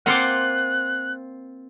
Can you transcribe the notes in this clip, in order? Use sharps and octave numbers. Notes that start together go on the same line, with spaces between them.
A#3 C4 F4 F#5 C6 D6 F#6